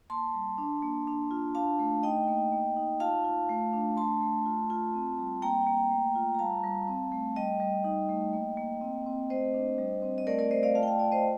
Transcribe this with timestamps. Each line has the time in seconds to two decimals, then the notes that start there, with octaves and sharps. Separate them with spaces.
0.10 A#3 A5 C6
0.34 G3
0.58 D4
0.83 A#3
1.07 D4
1.31 F4
1.55 D4 F5 A5
1.79 A3
2.03 D#4 D#5 G5
2.28 A#3
2.52 A#3
2.76 D#4
3.00 F4 F5 A5
3.24 F4
3.49 A3
3.73 D4
3.97 A3 A5 C6
4.21 A3
4.46 F4
4.70 F4
4.94 C4
5.19 G3
5.42 A#3 G5 A#5
5.67 A#3
5.91 A3
6.15 F4
6.34 A#5
6.39 G3 F5 A5
6.64 G3
6.88 C4
7.12 A3
7.36 G3 D#5 G5
7.60 G3
7.84 D#4
8.09 A3
8.33 A#3
8.57 A#3
8.81 C4
9.06 C4
9.30 A3 C5 D#5
9.54 D4
9.78 G3
10.02 C4
10.18 D#5
10.27 A3 A#4 D5
10.39 A#4 D5
10.51 A3 C5 D#5
10.63 D5 F5
10.75 F4 F5 A5
10.83 G5
10.87 F5 A5
10.99 F4 D5 F5
11.12 C5 D#5